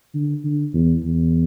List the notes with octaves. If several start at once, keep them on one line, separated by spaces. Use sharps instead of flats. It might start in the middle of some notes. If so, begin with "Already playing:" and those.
D3
D3
E2
E2